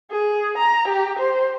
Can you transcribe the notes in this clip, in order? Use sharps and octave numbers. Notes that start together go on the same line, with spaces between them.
G#4
A#5
G4
C5